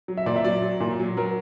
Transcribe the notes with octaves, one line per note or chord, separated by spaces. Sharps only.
F#3
E5
A#2 D5
E5
F#3 D5
F#3
A#2
F#3
F#3 A#4